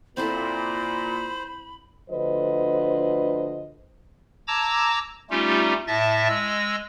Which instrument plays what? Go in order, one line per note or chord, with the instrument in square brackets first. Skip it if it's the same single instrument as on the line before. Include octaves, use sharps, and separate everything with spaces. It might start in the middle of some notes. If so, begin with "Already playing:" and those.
[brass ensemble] A#2 [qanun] C4 E4 A4 [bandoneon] C5 [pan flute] B5
[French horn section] D2 D3 F3 B4 C5 D#5
[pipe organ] A5 A#5 D6 E6 G#6 A#6
G3 A3 C#4 D#4 F4 G4
A2 E5 A5 A6 A#6
G#3 E6 A#6